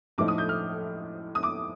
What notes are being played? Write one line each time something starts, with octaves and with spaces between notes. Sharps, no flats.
A2 F3 A3 D#4 D6
D#6
G6
F6
D#6
D6